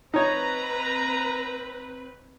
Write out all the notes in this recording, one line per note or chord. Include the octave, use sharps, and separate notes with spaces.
C4 D#4 B4 C#5 A#5